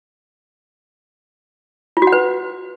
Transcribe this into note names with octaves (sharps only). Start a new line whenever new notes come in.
F4
F#4
F#5
B4